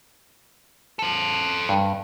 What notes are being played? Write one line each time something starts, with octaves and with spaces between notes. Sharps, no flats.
A4 C5
G2